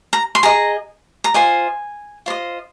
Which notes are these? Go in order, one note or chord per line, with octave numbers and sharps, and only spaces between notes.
A#5
C6
G#4 D#5 A#5
A#5
F4 C5 D#5 G#5
F4 C5 D#5